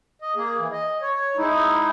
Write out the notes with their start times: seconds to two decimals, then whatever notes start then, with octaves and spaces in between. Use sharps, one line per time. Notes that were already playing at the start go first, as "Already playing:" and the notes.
0.22 D#5
0.36 A#3 G#4
0.58 E3
0.72 D#5
1.02 C#5
1.37 G#3 D#4 E4